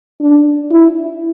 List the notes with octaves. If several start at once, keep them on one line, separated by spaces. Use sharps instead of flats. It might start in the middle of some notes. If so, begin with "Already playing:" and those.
D4
E4